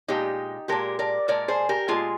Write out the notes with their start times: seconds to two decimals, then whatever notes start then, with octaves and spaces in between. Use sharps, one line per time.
0.08 A#2 G#3 D#4 G4
0.68 A#2 G#3 G4 A#4
0.99 A#4 D5
1.28 A#2 G#3 A#4 D5
1.48 G#4 C5
1.69 G4 A#4
1.88 A#2 G#3 F4 G#4